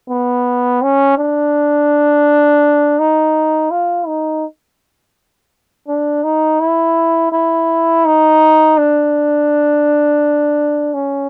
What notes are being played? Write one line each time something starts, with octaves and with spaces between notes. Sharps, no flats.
B3
C#4
D4
D#4
F4
D#4
D4
D#4
E4
E4
D#4
D4
C#4